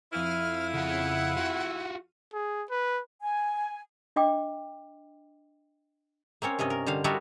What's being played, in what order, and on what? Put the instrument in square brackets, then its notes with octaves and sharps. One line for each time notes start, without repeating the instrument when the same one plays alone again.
[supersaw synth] F2 F5 D#7 [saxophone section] E4 [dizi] F6
[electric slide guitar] C#3 G#4 [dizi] F#5
[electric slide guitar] F4 F#4
[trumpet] G#4
B4
[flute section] G#5
[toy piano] D4 D#5 G5 D6
[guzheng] A#3 C4 C#4 C#5
G2 C3 C#4 D#5
A#4
D3 G3 C5 F5
G3 E4 F#4 A4 A#4 D#5